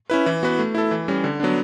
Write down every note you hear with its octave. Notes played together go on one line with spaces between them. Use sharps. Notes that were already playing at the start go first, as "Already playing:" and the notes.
C#4 E4 B4
E3
B3 F#4 B4
A3
E4 A4
E3
G3 C#4
D3
F#3 B3 D4